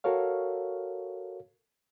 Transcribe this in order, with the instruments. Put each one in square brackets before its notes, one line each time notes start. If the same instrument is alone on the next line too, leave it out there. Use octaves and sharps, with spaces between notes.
[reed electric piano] F#4 A4 A#4 C#5 F5